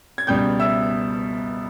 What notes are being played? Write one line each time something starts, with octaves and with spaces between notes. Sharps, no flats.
G#6
C#2 B2 G3 G5 G6
E5 E6